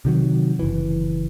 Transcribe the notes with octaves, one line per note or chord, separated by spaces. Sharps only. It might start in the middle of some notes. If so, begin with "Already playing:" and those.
C3 D#3 F#3
F#1 E3